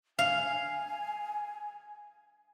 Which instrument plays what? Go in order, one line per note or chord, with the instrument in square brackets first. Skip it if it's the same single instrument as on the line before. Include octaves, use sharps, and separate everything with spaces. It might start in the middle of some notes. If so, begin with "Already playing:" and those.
[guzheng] F5 [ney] G#5